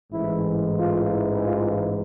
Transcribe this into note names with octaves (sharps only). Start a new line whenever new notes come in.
A1 G#2 E3 E4
F4
E4
F4